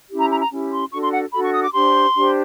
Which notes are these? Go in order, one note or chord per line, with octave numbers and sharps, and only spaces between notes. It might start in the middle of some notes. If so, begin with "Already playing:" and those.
C#4 E4 G4
A#5
A#5
A#5
C#4 E4 G4
C6
D4 F#4 A4 C#6
C6
F#5
D4 F#4 A4 B5
C#6
D#6
D6
D4 G4 C5 C6
D4 G4 C5